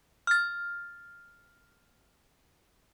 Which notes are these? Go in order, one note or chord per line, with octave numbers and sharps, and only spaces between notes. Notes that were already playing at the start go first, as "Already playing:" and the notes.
F6 A6